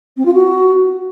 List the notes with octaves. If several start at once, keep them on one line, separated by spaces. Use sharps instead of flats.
C4
F4
F#4